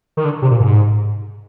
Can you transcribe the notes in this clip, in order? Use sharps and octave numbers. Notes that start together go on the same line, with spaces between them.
D#3
D3
C3
A#2
G#2